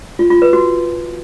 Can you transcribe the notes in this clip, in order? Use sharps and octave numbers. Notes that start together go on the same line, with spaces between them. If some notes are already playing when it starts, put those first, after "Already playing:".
F4
F4
B4
F#4